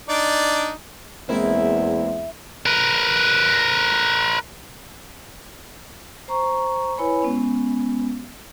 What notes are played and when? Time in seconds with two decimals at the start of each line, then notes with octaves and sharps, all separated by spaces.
0.09 D4 D#4 D5
1.29 E2 G#3 A#3 C4 E4
2.66 A#4 B4
6.28 C5 A#5 C#6
6.98 E4 B4 C#5 G#5 B5
7.22 G#3 B3 C#4